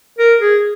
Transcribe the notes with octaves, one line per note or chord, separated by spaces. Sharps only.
A#4
G#4